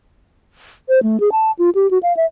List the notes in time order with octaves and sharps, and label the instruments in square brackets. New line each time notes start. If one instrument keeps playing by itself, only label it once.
[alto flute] C5
A3
G#4
A5
F4
G4
F#4
F5
E5